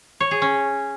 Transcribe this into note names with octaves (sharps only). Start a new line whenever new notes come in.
C#5
G#4
C#4